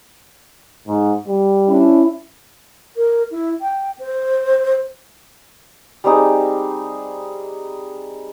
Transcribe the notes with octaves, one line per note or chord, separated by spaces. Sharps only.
G#2
G3
C#4 D4 E4
A#4
E4
G5
C5
G3 C4 D#4 G#4